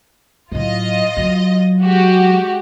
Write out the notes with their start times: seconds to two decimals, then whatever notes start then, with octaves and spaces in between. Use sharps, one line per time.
0.52 A2 F#3 F4 D#5
1.17 F#3
1.80 G#3 F#4 G4